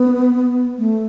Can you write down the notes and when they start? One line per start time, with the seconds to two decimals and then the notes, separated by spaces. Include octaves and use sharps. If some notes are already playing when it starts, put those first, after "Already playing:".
Already playing: B3
0.78 A3